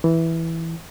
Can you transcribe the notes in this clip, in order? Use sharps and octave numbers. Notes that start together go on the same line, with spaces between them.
E3